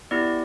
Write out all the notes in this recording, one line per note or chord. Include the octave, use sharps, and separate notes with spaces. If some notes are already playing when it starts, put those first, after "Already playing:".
B3 E4 G4 D5